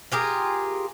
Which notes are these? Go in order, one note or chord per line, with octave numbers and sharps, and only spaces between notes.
F4 G4 G#4 A#4